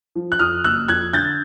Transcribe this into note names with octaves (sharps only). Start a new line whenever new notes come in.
F3
F#6
F2 D#6 F6
F#1 E6 F#6
F2 F#6 G#6
D3 G6 A6